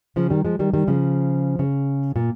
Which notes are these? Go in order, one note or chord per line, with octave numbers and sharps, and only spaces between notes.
C#3 F3
D#3 G3
F3 G#3
D#3 G3
D#3 G3
C#3 F3
C#3
A#2